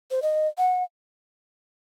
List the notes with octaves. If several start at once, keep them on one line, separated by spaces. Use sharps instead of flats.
C5
D#5
F#5